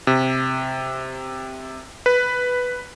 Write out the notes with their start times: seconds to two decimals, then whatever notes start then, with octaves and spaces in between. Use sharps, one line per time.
0.07 C3
2.06 B4